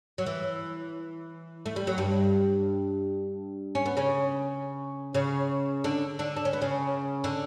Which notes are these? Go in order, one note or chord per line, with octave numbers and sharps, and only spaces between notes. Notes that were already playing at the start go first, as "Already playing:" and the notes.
F#3
E3
A3
G3
F#3
G2 G3
C#4
B3
C#3 C#4
C#3 C#4
D3 D4
D3 D4
D4
C#4
B3
C#3 C#4
D3 D4